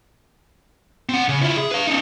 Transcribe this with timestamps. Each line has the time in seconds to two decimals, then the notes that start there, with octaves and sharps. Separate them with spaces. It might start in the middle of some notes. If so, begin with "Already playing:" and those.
1.09 C4 F#5
1.28 C#3
1.42 E4 F4
1.57 G#4
1.72 B4 F5
1.87 C#4 D#4